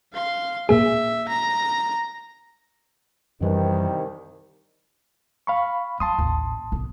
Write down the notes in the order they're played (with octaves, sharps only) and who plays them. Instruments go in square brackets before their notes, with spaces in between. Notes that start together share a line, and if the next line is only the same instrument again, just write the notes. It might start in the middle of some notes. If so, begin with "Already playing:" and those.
[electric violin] F5 C6
[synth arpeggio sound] A#2 A#3 G#4 [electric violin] E5
[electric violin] A#5
[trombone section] C2 D#3 [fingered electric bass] F#2 E3 G3
[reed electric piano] F5 B5 C#6
[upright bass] F#3 [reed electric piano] A5 C6 D#6
[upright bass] A1 D#2
B1